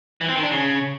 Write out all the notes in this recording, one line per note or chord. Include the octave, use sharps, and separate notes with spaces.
E3
C4
D#3
D4
C#3